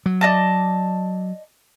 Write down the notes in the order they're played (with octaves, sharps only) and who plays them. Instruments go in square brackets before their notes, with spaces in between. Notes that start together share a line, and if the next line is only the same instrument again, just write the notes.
[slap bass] F#3
[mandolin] D5 D#5 A5